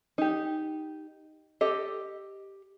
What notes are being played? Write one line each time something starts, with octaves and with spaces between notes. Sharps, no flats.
D#4 G4
G4 A4 D#5